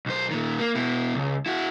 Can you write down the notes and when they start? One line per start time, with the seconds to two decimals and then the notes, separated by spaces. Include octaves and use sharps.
0.06 B1 C5
0.31 A#2 D#3
0.59 A#3
0.75 B2 E4
1.14 C#2
1.46 E4 F#4